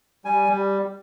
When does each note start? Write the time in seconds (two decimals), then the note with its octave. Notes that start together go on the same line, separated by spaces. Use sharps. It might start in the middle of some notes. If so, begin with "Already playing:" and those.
0.25 G3 G#5
0.48 G3